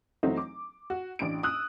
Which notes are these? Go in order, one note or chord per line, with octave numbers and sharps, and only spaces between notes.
E3 F#3 A3 C4 D#4
D6
F#4
A1 D4 D7
D#6 E6 F#6